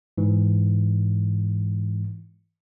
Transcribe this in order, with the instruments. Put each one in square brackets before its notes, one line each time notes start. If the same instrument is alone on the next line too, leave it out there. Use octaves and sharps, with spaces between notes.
[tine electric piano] G#2 E3